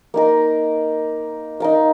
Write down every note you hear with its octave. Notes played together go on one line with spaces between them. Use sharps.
A#3 D#4 A#4
D#4 A#4 F5